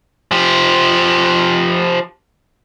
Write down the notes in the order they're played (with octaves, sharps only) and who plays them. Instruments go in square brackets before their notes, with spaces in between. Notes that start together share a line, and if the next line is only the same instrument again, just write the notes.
[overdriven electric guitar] F3 G4